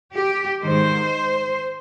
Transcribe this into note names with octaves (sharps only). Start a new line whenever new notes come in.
G4
G#2 D#3 C5